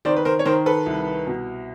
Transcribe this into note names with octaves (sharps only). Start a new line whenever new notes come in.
D#3 C5 D5
B4
A#4 C5
C#5
D#3 A#4 C5
A4 B4
C2
B2